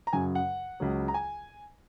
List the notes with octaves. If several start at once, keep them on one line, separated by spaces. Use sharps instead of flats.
A#5
F#2 C#3 F#3 G#5
F#5
C#2 C#3 F#3
A#5
G#5